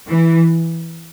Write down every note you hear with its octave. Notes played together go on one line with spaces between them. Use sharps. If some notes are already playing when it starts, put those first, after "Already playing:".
E3